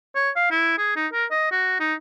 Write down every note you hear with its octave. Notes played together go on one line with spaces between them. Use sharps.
C#5
F5
E4
G#4
D#4
A#4
D#5
F#4
D#4